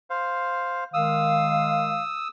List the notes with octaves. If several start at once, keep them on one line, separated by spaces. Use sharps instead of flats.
C5 F5
D#3 G#3 F5 D#6 E6